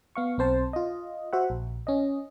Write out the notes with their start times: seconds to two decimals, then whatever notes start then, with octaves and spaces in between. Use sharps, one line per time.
0.16 B3 F5 C#6
0.38 B1 C4 C5 A5
0.73 F4 D#5
1.33 F#4 C5 E5 F#5
1.50 A#1
1.87 C#4 D#5